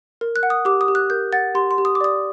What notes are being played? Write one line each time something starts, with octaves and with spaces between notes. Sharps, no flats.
A#4
F#6
F#5
D#6
G4 D6
D#6
G4
F#6
A#4 G6
F#5 A6
G4 C6
C6
G4
D#6
D6
D5 D#6